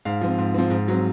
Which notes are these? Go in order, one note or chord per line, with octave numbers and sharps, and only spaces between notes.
G#2 F5
F3 C4
G#2
F3 C4
G#2
F#3 C4